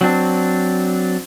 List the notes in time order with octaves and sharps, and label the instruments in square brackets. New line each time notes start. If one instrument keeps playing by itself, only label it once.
[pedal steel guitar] F#3 C4 D4